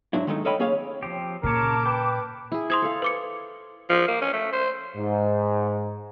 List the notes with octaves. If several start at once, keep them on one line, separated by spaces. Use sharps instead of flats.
G#2 F#3 D4 E4
D#3 G#3 A3 D#4
A4 C#5 D#5 F5 G5 B5
A#3 C#4 G#4 C#5 F5
F3 C4 G4
A#2 C#3 A#4 C#5 A5 D6
B4 G5
E4 G#4
C5 B5 C6 D#6 G#6
A4 F5
B4 D6 C#7
F3
A#3
C#4
A3
C5
G#2